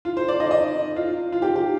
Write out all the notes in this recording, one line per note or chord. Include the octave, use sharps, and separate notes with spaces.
F4
C5
D5
D#5
D#5
F4
F4
G4
G4